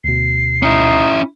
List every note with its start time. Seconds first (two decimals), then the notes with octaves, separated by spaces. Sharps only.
0.04 D2 B2 C7
0.63 C#4 D#4 E4